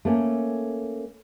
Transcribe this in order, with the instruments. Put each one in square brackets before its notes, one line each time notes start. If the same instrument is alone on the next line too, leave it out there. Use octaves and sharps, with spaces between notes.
[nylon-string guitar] A3 A#3 C#4